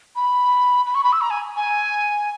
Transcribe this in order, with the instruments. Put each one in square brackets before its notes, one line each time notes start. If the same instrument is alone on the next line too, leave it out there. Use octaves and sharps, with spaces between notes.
[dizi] B5
B5
C#6
B5
E6
A#5
G#5
G#5